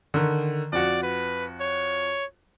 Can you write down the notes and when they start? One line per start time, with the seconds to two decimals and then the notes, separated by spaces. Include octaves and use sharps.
0.14 D3 D#3
0.72 F2 F#4 D5
1.03 B4
1.61 C#5